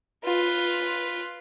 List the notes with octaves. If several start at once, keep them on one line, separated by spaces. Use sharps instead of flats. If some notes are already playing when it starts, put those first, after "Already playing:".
F4 B4